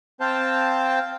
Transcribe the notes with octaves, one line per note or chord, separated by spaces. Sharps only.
C4 C5 F5 G5 A5